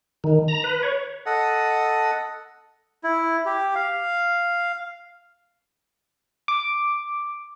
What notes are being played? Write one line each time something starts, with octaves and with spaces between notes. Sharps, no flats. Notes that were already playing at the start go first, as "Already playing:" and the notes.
D#3
A#5
B4
C#5
A4 D#5 F#5
E4
G4
F5
D6